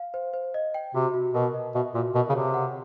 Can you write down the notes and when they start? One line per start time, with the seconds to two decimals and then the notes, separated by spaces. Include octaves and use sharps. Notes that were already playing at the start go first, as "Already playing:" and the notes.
Already playing: F5
0.14 C5
0.34 C5
0.54 D#5
0.74 G5
0.94 C3 F#4
1.14 F#4
1.34 B2 A#4
1.54 D#5
1.75 B2 E5
1.94 A#2 F#4
2.14 B2 A#4
2.29 C#3
2.35 C3 C#5
2.54 F#5